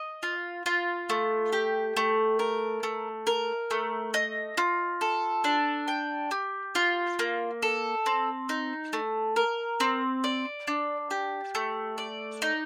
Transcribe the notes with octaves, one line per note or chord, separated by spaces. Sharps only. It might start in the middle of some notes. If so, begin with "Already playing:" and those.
Already playing: D#5
F4
F4
A3
G4
A3
A#4
A3
A#4
A3
D#5
F4
A4
D4
G5
G4
F4
A#3
A4
C4
D#4
A3
A#4
C4
D5
D4
G4
A3
D5
D#4